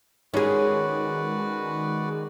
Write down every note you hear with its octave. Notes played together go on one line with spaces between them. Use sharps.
D#3 G#3 C#4 F#4 G#4 B4 D5